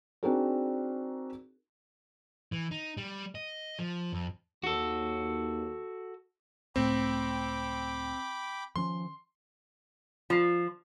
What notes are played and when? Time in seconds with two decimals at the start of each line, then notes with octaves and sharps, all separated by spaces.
0.23 C4 D4 D#4 F#4 G#4 A#4
2.52 E3
2.71 D#4
2.97 G3
3.35 D#5
3.79 F3
4.13 F2
4.64 D#2 F#4 A4
6.76 C#2 A2 A3 C4 G5 B5 D6
8.76 D#3 F3 C#4 C6
10.30 F3 F4 C7